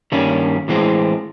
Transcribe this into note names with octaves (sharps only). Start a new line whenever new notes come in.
G2 D#3 G3 A#3 C#4
A2 E3 G#3 C4